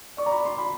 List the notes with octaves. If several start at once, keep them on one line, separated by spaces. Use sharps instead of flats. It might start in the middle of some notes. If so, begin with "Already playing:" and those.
D5 C#6
A#5
B5
C6
B5